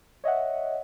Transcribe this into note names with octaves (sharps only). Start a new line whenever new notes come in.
C#5 D#5 E5 F#5